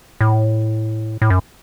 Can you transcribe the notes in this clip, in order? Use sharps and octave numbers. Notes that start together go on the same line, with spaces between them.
A2
A2
F#2